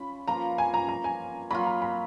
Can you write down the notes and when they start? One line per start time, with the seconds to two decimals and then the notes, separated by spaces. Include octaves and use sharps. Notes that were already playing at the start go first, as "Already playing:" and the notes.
Already playing: C#4 F4 B5
0.27 F3 A#3 F4 B4 A#5
0.58 G#5
0.74 A#5
0.88 A#5
1.04 G#5
1.50 F#3 A#3 F4 B5
1.66 A#5
1.82 B5